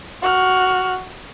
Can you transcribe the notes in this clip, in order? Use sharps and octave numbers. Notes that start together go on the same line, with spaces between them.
F#4 F6